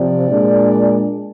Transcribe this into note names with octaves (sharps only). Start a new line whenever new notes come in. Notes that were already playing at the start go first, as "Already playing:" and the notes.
Already playing: C3 F3 C4 D5
A#2 G#3 D4